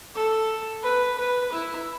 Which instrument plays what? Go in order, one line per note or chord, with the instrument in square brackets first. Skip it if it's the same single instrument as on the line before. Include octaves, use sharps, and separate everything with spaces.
[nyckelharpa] A4
B4
B4
E4